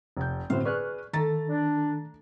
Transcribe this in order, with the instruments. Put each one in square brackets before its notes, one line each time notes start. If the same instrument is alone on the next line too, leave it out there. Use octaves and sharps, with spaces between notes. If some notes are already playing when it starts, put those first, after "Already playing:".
[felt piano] F1 G6
[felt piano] G1 A2 F#4 [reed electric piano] C4 C5 [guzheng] F5
[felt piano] G#4 B4 D5 [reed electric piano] C#6 F6 F#6
[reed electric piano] D#3 A4 [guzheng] A3 [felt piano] A#5 A6
[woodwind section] D4